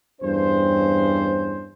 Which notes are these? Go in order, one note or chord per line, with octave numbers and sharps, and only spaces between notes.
E2 G2 C#4 C5